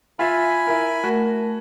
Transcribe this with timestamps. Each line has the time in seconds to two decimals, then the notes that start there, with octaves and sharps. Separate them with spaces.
0.19 F4 E5 G#5 B5
0.67 E4 A#4
1.04 A3 F#4 A#4